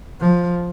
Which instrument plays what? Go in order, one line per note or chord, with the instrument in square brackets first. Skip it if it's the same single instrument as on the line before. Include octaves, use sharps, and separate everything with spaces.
[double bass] F3